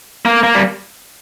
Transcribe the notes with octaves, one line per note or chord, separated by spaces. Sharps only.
A#3
A#3
G3